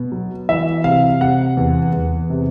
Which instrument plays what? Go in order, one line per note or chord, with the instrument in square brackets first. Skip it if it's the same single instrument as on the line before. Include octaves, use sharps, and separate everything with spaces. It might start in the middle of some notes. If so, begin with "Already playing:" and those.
Already playing: [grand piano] B2 B3
F#3
E3 E5
C3 F5
C3 F#5
E2
E2
C3